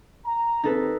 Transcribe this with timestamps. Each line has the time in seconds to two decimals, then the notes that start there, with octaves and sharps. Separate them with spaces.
0.25 A#5
0.64 D#2 C4 D#4 A4 B4